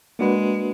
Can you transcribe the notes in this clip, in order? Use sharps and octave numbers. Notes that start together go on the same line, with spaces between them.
G#3 A#3 D4 F#4 B4